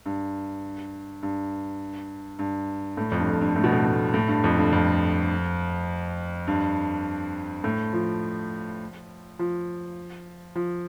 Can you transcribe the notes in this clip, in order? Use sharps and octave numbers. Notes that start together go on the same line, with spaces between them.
G2
G2
G2
A2
F2
G2
F2
G2
A2
B2
A2
A2
A2
G2
F2
G2
F2
G2
A2
F3
F3
F3